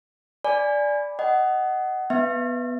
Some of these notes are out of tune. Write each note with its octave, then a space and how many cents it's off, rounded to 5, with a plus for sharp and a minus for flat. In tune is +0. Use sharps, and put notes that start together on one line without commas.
D5 -5 G#5 +0 B5 +0
D#5 +0 F#5 +20
B3 +0 E5 -10